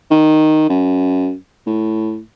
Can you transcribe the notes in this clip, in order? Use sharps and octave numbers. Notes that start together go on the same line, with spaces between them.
D#3
F#2
A2